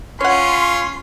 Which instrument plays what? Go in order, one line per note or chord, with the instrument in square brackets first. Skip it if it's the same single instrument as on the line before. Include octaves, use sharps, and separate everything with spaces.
[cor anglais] C#4 [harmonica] F4 [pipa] C#5 F#5 [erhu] C6